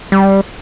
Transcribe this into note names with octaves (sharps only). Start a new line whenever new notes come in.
G3